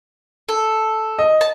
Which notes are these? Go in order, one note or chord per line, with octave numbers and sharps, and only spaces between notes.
A4
D#5
A5